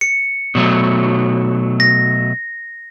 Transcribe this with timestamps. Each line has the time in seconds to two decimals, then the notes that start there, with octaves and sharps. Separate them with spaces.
0.01 C#7
0.55 B2 F#3 A3
1.80 A#6